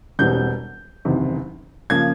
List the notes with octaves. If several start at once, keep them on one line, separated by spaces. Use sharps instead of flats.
E1 E2 B2 G3 C4 G6
F#1 E2 C3 D#3
C#3 F3 A#3 G#6